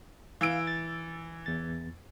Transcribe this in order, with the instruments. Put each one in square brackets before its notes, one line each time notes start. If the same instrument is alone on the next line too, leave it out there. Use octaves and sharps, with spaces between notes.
[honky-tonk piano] E3 E6 D7 [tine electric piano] F5
[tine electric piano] A6
E2 A6